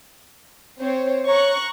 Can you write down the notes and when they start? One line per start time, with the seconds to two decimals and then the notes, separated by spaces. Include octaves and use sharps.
0.80 C4 C5 C#5
1.27 C#5 A#5 C#6 F#6